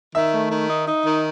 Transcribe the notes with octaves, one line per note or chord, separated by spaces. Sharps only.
D#3 E5
A3
D#3
D#4
D#4
D#3